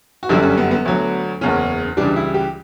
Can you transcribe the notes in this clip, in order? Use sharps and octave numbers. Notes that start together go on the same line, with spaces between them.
F#4
G1 F#2 D3 G3 E4
C#4
B3
B3
D2 D3 F#3
F#1 E2 C#3 C#4
C#2 C#3 E3 G3 D4
E4
G4